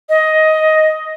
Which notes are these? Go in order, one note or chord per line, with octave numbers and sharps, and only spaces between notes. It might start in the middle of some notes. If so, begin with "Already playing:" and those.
D#5